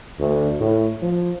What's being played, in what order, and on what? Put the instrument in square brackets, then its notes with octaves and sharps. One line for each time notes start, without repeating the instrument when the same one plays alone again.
[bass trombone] D2
A2
F3